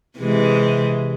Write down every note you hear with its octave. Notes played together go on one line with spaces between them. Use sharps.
C3 E3 G#3